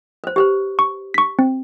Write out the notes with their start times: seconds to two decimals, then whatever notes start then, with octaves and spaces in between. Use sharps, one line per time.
0.24 B4 C5
0.36 G4 B4 C5
0.79 C#6
1.14 C#6 B6
1.39 C4